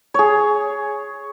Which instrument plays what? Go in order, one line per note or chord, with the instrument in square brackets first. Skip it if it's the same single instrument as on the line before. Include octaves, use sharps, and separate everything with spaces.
[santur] G#4 C#5